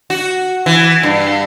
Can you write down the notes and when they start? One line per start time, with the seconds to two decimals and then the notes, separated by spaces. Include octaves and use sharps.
0.10 F#4
0.66 E3
1.03 G2